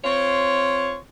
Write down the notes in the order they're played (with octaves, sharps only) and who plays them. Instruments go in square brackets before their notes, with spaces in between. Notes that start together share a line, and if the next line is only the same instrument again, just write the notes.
[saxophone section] C4 F4 C#5